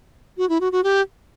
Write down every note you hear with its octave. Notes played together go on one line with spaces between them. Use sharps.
F#4
E4
F#4
F#4
G4